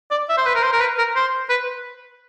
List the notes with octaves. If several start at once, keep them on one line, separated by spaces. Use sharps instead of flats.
D5
E5
C5
B4
A#4
C5
A#4
B4
A#4
C5
B4